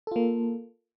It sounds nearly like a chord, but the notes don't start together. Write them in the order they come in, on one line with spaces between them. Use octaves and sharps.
A4 F4 A#3